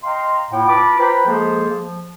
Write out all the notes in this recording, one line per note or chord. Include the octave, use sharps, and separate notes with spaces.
D#5 F5 G5 A#5 C6
A2 A#3 E4 F4 F#5 G5
F4 B4 A5 B5 D6
F4 B4 C5 G5 A#5 B5
F3 G#3 A#3 G#4 A4 C5
F3